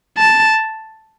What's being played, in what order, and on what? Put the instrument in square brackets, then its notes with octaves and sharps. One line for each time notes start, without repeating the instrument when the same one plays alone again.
[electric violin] A5